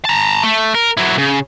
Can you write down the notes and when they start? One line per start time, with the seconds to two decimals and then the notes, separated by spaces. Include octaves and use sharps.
0.05 A5 A#5
0.43 A3
0.75 A#4
0.97 F#3 E4
1.18 C#3